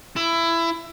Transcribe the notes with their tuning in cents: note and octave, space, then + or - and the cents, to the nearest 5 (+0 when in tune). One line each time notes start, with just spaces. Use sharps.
E4 +20